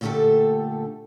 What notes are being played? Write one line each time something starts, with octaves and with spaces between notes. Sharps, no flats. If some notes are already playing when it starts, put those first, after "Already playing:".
A#2 D3 A3 F4 G4 A4